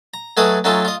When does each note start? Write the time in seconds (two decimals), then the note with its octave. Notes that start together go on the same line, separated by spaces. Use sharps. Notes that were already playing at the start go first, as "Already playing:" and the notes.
0.14 A#5
0.37 F#3 A3 G#4 A4 B4 D#5
0.64 F#3 A3 C#4 D#4 F4 A4
0.85 F4 D#5